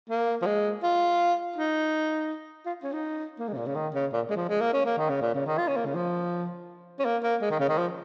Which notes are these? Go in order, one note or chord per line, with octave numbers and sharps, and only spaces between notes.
A#3
F3
G#3
F4
D#4
F4
C#4
D#4
A#3
G#3
C#3
A#2
C#3
D#3
C#3
A#2
G#3
F3
G#3
A#3
C#4
A#3
D#3
C#3
A#2
C#3
D#3
F4
C#4
A#3
C#3
F3
C#4
A#3
A#3
G#3
D#3
C#3
D#3
F3